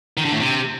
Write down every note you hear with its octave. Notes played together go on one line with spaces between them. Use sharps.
D#3
D3
A2
C3